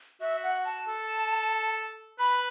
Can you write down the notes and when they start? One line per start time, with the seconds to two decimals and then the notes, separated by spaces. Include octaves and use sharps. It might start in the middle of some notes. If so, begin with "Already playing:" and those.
0.21 F#4 E5
0.43 F#5
0.65 A5
0.88 A4
2.19 B4 B5